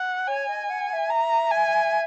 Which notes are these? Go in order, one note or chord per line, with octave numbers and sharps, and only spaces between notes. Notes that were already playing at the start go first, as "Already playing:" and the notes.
Already playing: F#5
C#5 G#5
D#5
F#5
F#5
E5
A#5
G#5